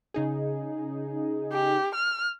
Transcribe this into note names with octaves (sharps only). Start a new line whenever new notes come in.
C#3 D#4 G#4
G4
F6